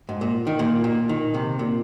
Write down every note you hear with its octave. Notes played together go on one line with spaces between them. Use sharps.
G#2
A#2
D#3
A#2
A#2
D#3
C3
A#2